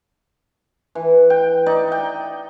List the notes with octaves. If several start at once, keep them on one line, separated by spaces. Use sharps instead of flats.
E3
G5
D#4 D5
G5